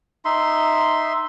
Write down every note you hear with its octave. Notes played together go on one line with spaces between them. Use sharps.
D#4 E5 C6